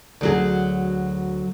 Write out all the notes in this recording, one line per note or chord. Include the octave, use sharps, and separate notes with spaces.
D2 F#3 G#4